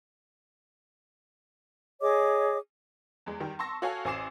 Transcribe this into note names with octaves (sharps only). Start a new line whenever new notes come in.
G#4 C#5 D#5 D6
E2 G#3
D#3 G3 G5
A5 C6 C#6 E6 A#6
F#4 A4 C#5 F5 G#5
A1 C5 G#5 D6 C7 E7